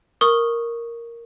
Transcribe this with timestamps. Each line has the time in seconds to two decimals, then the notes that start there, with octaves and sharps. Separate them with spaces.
0.21 A#4 C#6 D#6 G7